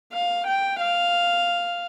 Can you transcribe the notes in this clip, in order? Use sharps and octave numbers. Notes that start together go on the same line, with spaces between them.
F5
G5
F5